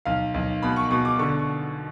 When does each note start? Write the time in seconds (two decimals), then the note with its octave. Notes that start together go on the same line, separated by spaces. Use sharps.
0.05 B1 F5
0.34 B1
0.63 B2 B5
0.76 C#6
0.90 B2 C#6
1.05 D6
1.19 D3 C#6
1.39 C#6